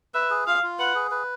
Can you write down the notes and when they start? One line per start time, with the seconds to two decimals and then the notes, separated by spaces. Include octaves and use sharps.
0.14 B4 E5
0.30 G#4
0.47 F4 F5
0.63 F4
0.79 B4 F#5
0.95 G#4
1.11 B4